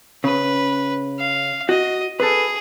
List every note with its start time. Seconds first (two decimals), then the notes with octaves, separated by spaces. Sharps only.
0.24 C#3 B4
1.19 F5
1.69 F#4 D#5
2.20 G#4 A4 B4